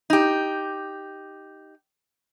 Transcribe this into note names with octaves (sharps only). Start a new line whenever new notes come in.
D#4 G4